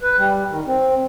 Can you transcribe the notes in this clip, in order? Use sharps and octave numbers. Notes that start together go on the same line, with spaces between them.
B4
G3
D#3
C4